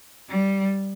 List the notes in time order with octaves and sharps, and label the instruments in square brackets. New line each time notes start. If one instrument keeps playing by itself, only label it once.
[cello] G3